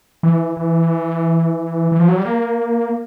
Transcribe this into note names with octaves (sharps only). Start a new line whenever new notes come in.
E3
E3
E3
F3
F#3
G3
A#3